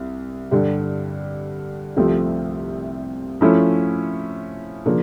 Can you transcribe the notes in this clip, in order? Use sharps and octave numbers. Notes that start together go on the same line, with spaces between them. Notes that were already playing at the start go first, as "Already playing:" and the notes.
Already playing: C2
G2 D3 G3
C2 C3 F3 A3 C4
F3 A3 C#4 E4
C#3 F3 A#3 D4